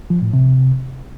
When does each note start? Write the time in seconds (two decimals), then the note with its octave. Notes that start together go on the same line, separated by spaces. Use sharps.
0.10 F3
0.22 A2
0.33 C3